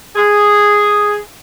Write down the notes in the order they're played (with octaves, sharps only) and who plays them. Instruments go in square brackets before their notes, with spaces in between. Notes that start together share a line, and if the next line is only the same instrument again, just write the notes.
[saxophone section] G#4